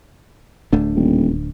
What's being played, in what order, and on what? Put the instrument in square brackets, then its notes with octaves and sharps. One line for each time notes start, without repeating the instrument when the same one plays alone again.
[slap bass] D1 A3 D4
[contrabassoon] D#1